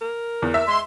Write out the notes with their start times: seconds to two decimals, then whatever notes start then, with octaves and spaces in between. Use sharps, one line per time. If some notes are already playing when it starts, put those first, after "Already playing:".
0.01 A#4
0.42 E2
0.54 E5
0.68 G#3 C6